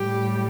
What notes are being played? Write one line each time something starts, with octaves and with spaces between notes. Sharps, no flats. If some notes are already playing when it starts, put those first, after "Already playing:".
Already playing: A2 G3 G4